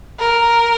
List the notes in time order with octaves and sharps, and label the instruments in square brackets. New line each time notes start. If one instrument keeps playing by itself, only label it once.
[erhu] A#4